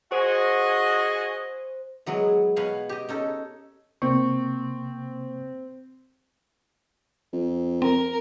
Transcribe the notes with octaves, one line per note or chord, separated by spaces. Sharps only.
F#4 G#4 C5 D#5 G#5
E3 F#3 G#3 B3
B2 B4 C#5 F5 G#5
G4 D#5
C#4 D#4 A4
C3 A#3 C4 C#6
F2
C4 A#4